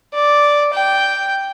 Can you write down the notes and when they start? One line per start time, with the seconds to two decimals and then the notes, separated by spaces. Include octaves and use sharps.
0.14 D5
0.73 G5